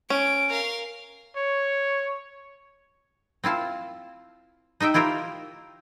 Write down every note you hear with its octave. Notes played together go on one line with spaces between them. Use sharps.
C#4 D7
A#4 F5
C#5
C4 E4 F4 A5
D#4 D#5 E5 G5
E4 F4 G4 A#4 C5